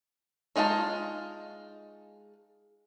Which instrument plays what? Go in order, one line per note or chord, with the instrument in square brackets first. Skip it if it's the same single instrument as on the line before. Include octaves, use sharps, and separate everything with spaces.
[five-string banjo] G#3 D#4 F4 F#4 A5